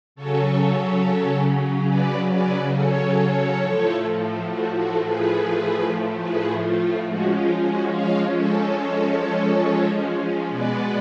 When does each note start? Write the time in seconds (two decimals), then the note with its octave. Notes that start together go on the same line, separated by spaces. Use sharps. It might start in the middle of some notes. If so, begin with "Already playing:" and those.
0.15 C#3 F#3 C#4 A4 C#5
1.88 B4 D5
2.31 B4 D5
2.74 A4 C#5
3.60 A2 F3 A3
4.47 F#4
4.75 F#4 A4
5.04 G#4 B4
6.19 G#4 B4
6.61 F4
7.05 F3 G#3 C#4 F#4
7.33 F4
7.62 F#4
7.91 C#5 F5
8.34 A4 C#5
10.49 B2 G#3 B3 B4 D5